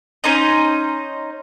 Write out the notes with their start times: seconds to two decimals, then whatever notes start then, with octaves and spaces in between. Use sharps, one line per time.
0.24 C#4 D#4 C5 D#5